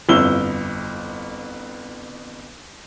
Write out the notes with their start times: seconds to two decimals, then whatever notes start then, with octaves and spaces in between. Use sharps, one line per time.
0.09 G1 F2 E4 F4 E6 G7